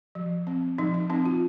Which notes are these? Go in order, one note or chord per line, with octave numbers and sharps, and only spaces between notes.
F3
C4
F3 D#4
D#4
C4 D#4
F4